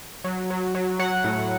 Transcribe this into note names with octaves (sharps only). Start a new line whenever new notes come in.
F#3
F#3
F#3
F#3 F#5
A2